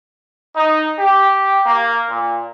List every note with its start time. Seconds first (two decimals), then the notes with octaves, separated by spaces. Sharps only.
0.56 D#4
0.99 G4
1.66 A#3
2.09 A#2